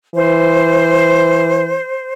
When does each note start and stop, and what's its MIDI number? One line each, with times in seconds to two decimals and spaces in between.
0.15 1.79 52
0.15 2.13 72